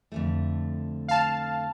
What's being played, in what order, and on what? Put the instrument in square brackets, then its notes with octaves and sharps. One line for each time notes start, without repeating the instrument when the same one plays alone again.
[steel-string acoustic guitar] F2 D3 A3
[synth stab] F5 A5